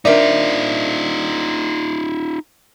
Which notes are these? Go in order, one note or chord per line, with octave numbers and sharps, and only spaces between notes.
D4 D#4 F4 A#4 C5 D5 E5